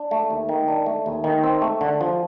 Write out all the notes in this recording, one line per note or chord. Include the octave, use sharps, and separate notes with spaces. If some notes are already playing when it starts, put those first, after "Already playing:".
Already playing: D4
A3
D#2
D#3
D4
A3
D#2
D#3
C4
A3
D3
F3